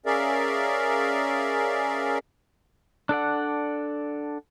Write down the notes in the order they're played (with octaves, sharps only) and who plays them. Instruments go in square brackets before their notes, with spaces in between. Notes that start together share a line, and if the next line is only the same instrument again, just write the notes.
[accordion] C#4 G#4 A#4 D5 E5 F5
[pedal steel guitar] D4 A4 D5 F#5